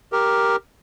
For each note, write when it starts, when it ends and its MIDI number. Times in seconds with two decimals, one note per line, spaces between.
0.12 0.56 67
0.12 0.56 70